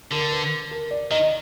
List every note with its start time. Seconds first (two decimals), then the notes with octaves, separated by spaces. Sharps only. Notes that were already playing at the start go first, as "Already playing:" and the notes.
0.12 D3 A#4
0.32 B4
0.71 A#4
0.91 D5
1.11 D#3 D#5